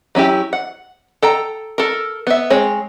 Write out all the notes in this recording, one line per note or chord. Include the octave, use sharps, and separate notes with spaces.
F#3 C#4 E4 G4
F#5
A4 G5 A#5
A4 A#4
B3 E5
G#3 C4 C#5